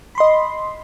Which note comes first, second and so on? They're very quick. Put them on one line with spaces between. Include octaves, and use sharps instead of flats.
B5 C6 D#5